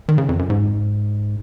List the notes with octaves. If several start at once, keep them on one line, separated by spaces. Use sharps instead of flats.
D#3
C#3
F2
F#2
G#2